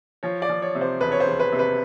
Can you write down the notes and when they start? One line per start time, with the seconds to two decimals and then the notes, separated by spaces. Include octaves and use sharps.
0.23 F3 C#5
0.42 D5
0.49 F3
0.62 C#5
0.75 C3
0.81 C5
1.00 E1 B4
1.12 C#5
1.20 C5
1.27 E1
1.39 B4
1.52 C3
1.59 B4